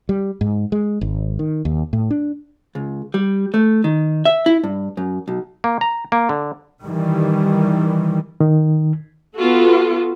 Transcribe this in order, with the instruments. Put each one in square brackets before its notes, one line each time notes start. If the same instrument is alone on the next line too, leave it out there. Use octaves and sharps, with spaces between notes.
[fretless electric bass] G3
G#2
G#3
G#1
D#3
D#2
A2
D4
[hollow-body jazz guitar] C#2
G3
A3
D#3
E5
E4
G2
F#2
B1
[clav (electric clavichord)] A#3
A#5
A#3
D3
[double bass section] D#3 E3 G3
[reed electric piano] D#3
[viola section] B3 F4 F#4 A4